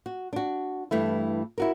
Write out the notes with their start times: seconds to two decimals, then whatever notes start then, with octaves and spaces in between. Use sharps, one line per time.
0.06 F#4
0.33 D4 F#4
0.91 G2 E3 A3 E4
1.58 E4 F#4 A#4